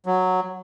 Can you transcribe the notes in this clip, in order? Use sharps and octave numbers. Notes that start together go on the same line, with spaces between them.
F#3